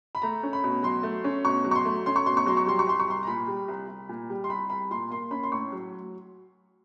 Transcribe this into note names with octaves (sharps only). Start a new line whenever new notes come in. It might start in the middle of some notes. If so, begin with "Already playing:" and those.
B5
A3 A#5
C#4
B5
B2
F#3 C6
A3
C#4
B2 C#6
F#3
C#6
C6
A3
C#4 C6
C#6
B2 C6
C#6
F#3 C6
C#6
G3 C6
C#6
C2 C6
C#6
C2 C6
A#5
A#2 B5
G3
C2
C2
A#2
G3
C6
C2 B5
C2 B5
A#2 C6
A#3 C6
C#4 B5
C6
A2 C#6
F#3